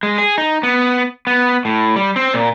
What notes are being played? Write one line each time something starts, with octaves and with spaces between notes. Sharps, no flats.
G#3
G#4
D#4
B3
B3
A2
G3
C4
A#2